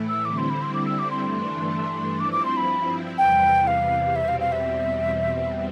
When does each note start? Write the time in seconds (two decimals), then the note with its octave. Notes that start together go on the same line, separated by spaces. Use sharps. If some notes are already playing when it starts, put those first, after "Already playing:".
Already playing: A2 E3 A3 E4
0.09 E6
0.25 D3 G3 C4 E4 D6
0.38 C6
0.50 B5
0.62 C6
0.74 D6
0.86 E6
0.99 D6
1.11 C6
1.23 G2 E3 A3 D4
2.20 G2 F3 C4 E4 D6
2.32 D6
2.45 C6
2.57 B5
3.18 E2 C3 E3 G3 G5
3.67 F5
4.16 E2 B2 G3 C4 E5
4.28 F5
4.40 F5
4.52 E5
5.13 E2 B2 G3 C4